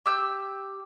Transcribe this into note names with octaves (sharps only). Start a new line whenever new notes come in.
G4 E6 G6